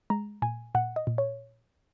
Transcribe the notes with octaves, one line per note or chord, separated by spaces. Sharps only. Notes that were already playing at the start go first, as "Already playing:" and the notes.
G#3 A#5
A#2 G#5
A#2 F#5
D#5
A#2
C#5